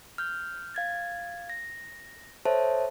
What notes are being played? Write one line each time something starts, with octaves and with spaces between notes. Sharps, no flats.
F6 G6
F5 G#6 A6
A#6
A4 C5 C#5 E5 A5